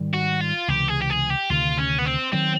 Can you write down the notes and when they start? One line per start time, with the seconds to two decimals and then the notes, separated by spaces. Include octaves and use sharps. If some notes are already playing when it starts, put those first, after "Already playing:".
Already playing: G#2 D#3 G3
0.13 F#4
0.41 F4
0.68 C#2 C3 E3 G4
0.88 G#4
1.01 G4
1.10 G#4
1.30 G4
1.50 D2 C3 D#3 F4
1.78 C#4
1.98 B3
2.05 C4
2.32 D#3 F#3 C4